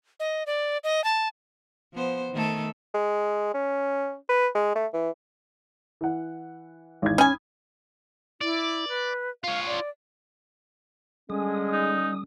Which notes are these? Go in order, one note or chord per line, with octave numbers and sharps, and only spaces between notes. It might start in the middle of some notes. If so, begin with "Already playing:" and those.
D#5
D5
D#5
A5
F3 B3 C5
D#3 A3 A4
G#3
C#4
B4
G#3
A3
E3
E3 F#5
G#1 E2 G#6
C#4 G#5 B5 D#6
E4 D5
B4
F4 C#5 F5
D5
D3 G3 G#3 C#4 D#6
D#4